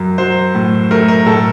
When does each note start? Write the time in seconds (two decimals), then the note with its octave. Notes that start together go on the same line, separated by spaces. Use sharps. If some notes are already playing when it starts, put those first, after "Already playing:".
Already playing: F#2
0.18 F#3 C5
0.55 A2
0.91 A3 A#4
1.08 A#4
1.26 A2 A4